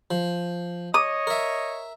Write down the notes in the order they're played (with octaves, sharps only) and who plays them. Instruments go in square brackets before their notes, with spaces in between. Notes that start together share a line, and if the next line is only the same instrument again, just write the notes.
[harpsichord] F3
[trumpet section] C#5 D#5 [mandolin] D#6
[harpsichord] A#4 E5